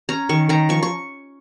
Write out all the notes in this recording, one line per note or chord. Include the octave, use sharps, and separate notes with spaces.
C#4 A#5
D#3 C#6
D#3 A#5
F3 C#6
C#6